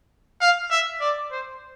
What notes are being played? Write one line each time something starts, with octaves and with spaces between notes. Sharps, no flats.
F5
E5
D5
C5